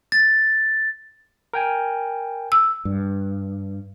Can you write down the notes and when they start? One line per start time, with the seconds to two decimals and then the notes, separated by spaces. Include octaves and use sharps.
0.12 A6
1.53 A#4 G5 G#5
2.52 E6
2.85 G2